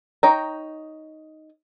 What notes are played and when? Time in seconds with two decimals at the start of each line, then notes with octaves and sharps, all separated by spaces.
0.23 D#4 C#5 G5 A#5